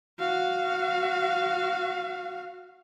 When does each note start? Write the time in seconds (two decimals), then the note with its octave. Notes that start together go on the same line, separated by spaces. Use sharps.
0.19 F#4 F5